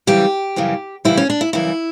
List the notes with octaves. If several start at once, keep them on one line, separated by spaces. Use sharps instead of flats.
F#2 C#3 E3 G3 G4
F#2 C#3 E3 G3
F#2 C#3 E3 G3 E4
C#4
D4
E4
F#2 C#3 E3 G3 E4